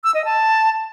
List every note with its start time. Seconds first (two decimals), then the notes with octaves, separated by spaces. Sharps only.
0.04 E6
0.14 D#5
0.25 A5